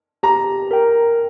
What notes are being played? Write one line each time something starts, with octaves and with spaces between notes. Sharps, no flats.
G4 A#5
A#4 G5